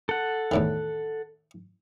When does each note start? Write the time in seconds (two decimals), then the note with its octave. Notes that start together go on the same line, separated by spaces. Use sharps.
0.09 A4 F#5
0.51 E2 A2 D#3